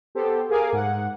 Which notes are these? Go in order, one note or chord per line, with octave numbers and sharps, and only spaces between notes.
B3 G4 A4 C5
G#4 A#4 F5 G#5 D6
G#2 F#5